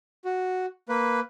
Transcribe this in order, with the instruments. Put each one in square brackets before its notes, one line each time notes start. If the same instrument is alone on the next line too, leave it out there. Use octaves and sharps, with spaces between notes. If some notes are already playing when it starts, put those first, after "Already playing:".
[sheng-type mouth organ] F#4
A#3 B4